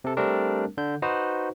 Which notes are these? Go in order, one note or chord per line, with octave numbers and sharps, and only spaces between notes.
C3 A4
G3 A3 C4 D4 A#4
D3 G6
D#4 F#4 B4 C5